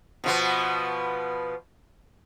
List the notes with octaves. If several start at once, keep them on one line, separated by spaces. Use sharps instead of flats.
B2 F3 B3